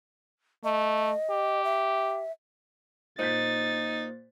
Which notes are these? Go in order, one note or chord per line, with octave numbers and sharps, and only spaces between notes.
A3 D#5
G4
E5
A#2 D#4 C5 G6 A6 B6